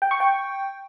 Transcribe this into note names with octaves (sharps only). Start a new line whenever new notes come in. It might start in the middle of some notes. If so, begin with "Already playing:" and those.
G5
C#6
G5